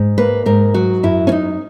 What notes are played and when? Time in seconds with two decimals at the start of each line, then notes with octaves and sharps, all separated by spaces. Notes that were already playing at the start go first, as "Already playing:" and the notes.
Already playing: G#2
0.18 A#3 B4
0.46 G#2 A#4
0.74 F#3 F#4
1.03 F#2 E4
1.27 C#4
1.32 F#2 D#4